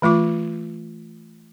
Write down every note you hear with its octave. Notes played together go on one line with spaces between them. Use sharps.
E3 A3 F4 D6